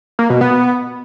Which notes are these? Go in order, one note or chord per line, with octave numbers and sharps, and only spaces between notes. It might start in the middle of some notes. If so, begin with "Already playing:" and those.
A#3
B2
B3